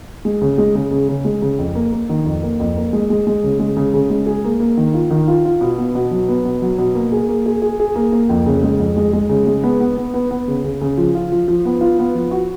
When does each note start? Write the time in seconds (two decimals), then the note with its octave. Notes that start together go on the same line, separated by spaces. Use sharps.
0.25 G#3
0.42 C#3
0.58 G#3
0.75 C#3
0.91 C#3
1.09 C#3
1.25 G#3
1.42 C#3
1.58 F2
1.75 A#3
1.93 A#3
2.09 D#3
2.26 F2
2.43 A#3
2.60 F2
2.76 A#3
2.93 G#3
3.10 G#3
3.27 G#3
3.44 C#3
3.60 G#3
3.77 C#3
3.94 C#3
4.10 G#3
4.26 G#4
4.44 A#3
4.60 A#3
4.77 D#3
4.94 F4
5.10 D#3
5.28 F4
5.45 F4
5.61 B2
5.78 B3
5.95 B2
6.11 F#3
6.29 B3
6.45 B2
6.62 F#3
6.78 B2
6.95 A#3
7.12 G#4
7.29 A#3
7.46 G#4
7.62 G#4
7.80 G#4
7.96 A#3
8.12 A#3
8.29 F2
8.46 C#3
8.63 G#3
8.80 F2
8.97 G#3
9.13 G#3
9.29 C#3
9.47 G#3
9.63 B3
9.80 B3
9.97 B3
10.14 B3
10.31 B3
10.48 C#3
10.64 C#3
10.81 C#3
10.98 F3
11.15 F4
11.32 F3
11.48 F3
11.65 B3
11.81 F4
11.99 B3
12.14 F3
12.31 F#4